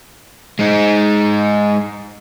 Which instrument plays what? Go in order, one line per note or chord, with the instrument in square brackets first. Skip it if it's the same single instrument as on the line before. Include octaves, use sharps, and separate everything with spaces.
[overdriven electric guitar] G#3 D#4